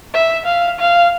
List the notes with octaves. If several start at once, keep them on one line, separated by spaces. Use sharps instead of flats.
E5
F5
F5